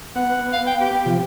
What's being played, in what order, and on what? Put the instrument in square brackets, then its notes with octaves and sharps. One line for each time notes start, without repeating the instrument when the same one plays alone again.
[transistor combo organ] B3 [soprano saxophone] F#5
[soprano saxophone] F5
G5
G4
[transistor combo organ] C3 F3